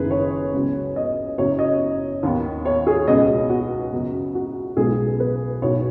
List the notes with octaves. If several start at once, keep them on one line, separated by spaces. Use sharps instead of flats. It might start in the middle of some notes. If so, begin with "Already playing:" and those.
Already playing: F#1 F#2 D#3 B3 G#4 B4
C#5
C#2 C#3 F#3 B3
D#5
F#1 F#2 F#3 B3 C#5
D#5
D#2 D#3 B3
C#5
G#4
C#2 B2 B3 D#5
F#4
F#2 C#3 F#3 B3
F#4
B1 B2 G#3 B3 G#4
B4
B1 B2 B3 C#5